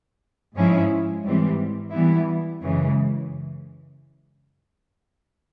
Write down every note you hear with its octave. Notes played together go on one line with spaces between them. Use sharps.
G#2 F3 G#3 C#4 E4
G#2 E3 G3 C4
E3 G3 B3 E4
F#2 C#3 E3 G#3